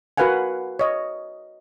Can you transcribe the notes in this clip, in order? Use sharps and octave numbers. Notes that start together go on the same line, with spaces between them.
F#4 A#4 B4 F5 F#5 G#5
C#5 D#5